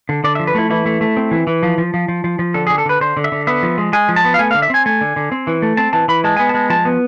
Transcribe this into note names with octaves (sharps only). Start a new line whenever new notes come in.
D3
D3 D5
E5
F3
B4
A3 E4
E3 E4
A3
A3
C4
E3
E3
F3
F3
F3
F3
F3
F3
D3 A4
G#4
D3
A4
D3 B4
D3 C5
D3
E5
D3
B3 E5
F3
G#3
G#3 G#5
F3
A5
B3
F5
A3 G#5
F5
D3
E5
C4 G#5
A3 G#5
D3
D3
C4
E3
A3
C4 A5
E3 A5
E3 B5
G#3 A5
B3 G#5
A5
G#3
F3 A5
B3